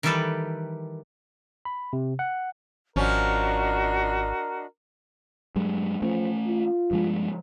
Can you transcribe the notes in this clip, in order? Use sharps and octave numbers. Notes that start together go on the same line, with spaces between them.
D#3 E3 G3 G4 A4 B4
B5
C3
F#5
G#1 F3 C#4 D4 F#4 A#4 D#5
G2 F#3 G#3
F3 A3 C#4
F4
G2 F3 G#3